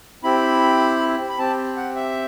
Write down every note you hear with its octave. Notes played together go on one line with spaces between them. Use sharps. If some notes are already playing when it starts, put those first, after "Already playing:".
C4 E4 G4 B5
B5
C4 G4 A5
F#5
E5